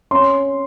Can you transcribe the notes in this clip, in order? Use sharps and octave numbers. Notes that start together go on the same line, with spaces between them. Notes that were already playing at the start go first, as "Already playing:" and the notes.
C#4 C6